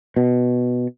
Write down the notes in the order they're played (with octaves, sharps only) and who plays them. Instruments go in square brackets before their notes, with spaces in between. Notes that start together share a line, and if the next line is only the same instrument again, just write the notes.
[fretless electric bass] B2